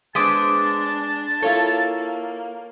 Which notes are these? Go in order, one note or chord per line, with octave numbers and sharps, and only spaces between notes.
G#3 B3 D4 C5 A5 D6 D#6 B6
A#3 E4 F4 A4 C#5